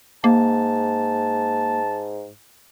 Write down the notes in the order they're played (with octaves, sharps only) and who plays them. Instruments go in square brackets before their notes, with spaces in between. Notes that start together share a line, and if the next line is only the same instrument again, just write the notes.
[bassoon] G#2 [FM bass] A#3 [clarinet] A5